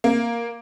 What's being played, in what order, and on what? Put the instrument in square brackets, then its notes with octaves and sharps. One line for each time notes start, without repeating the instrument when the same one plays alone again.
[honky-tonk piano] A#3